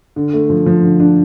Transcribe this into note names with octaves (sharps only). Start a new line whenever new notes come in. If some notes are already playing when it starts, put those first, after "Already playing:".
D3
A3
F3
F3
D3
D4